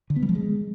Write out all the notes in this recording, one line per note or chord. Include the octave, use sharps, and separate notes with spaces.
D3
B3
G3
F3
G#3